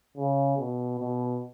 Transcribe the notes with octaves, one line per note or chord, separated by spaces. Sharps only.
C#3
B2
B2